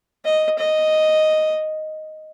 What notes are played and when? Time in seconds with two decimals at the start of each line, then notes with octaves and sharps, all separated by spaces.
0.25 D#5
0.58 D#5